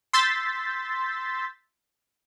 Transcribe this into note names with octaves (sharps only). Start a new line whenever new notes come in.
C6 E6 G6 A6 B6